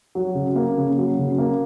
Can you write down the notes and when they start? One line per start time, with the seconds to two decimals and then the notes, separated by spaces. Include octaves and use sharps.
0.15 F#3
0.35 C#3
0.56 A#3
0.77 C#3
0.98 F#3
1.19 C#3
1.38 A#3